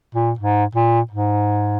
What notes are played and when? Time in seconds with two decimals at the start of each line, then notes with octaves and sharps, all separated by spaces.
0.15 A#2
0.39 G#2
0.75 A#2
1.11 G#2